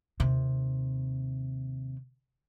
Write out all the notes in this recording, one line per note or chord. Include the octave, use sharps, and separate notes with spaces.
D#2 C3